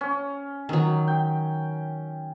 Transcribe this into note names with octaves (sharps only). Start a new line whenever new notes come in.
C#4
D#3 F#3
G5